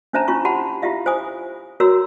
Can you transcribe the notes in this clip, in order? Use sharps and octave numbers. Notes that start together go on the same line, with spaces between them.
C#4 D4 C5 E5 A5 A#5
C#4 D4 E4 F4 C#6
G4 F#5 A5 B5 C6
E4 F4 G4 E5 F5
C5 G#5 D#6
F#4 A#4 C#5 A#5 C6 E6